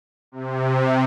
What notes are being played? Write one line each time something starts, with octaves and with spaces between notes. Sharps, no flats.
C3